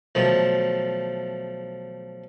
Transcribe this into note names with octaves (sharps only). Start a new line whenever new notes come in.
B1 D#3 F3 A3